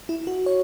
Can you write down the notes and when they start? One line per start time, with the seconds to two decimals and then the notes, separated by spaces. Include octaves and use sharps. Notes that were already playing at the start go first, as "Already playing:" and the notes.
0.09 E4
0.27 F#4
0.46 C#5